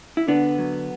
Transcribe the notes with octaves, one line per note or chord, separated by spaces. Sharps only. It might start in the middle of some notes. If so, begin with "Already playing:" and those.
E4
D3 B3 D4
F#3